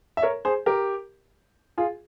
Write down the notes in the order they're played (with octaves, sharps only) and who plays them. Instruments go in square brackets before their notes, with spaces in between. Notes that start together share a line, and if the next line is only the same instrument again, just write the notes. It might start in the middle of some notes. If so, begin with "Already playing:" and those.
[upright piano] E5
A#4 C#5
G#4 C5
G4 A#4
F4 G#4